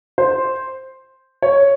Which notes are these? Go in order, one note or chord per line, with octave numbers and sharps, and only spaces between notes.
C5
C#5